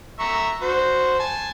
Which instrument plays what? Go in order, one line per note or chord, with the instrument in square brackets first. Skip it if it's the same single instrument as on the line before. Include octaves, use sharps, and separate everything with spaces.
[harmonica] E5 A#5 C#6
F#4 C5
G#5 A5